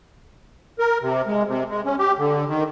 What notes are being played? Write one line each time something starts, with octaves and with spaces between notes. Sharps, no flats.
A#4
C3
G#3
C3
G#3
C#4
G4
D3
D#3